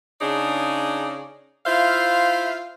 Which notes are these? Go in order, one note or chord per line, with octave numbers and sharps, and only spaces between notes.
C#3 D4 D#4 G#4 C#5 D5
E4 F4 C5 E5 F5